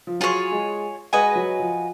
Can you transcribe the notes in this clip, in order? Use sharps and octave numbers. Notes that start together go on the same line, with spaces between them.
F3
F#3 F4 G#4 C#5
G#3
G#3 F#4 B4 D#5 G#5
F#3
F3